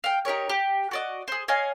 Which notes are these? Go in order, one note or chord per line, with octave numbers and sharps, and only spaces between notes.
F5 G5
D#4 G4 A#4 C#5
G4
F#4 D5 D#5
G#4 C5
C#5 D#5 F5 G#5